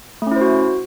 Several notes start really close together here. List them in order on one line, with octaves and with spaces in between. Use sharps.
A3 C#4 E4 C5 F#4